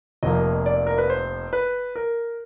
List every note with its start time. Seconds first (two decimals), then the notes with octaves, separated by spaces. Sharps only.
0.23 F1 F2 C3 F3 A#3 D#5
0.66 D5
0.87 A#4
0.98 B4
1.10 C5
1.53 B4
1.96 A#4